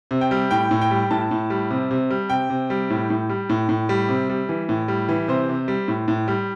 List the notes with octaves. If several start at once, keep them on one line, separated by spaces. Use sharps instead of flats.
C3
G5
G3
A2 G5
A2
G5
G3
A2 A5
A2
G3
C3
C3
G3
C3 G5
C3
G3
A2
A2
G3
A2
A2
G3
C3
G3
E3
A2
G3
E3
C3 C5
C3
G3
A2
A2
G3